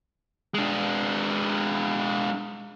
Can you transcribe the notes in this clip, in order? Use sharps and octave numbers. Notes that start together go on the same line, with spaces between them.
G#3 D4